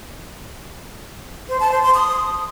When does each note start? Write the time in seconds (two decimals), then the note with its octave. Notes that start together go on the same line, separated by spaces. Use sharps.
1.49 C5
1.60 A5
1.72 C5
1.83 C6
1.95 D#6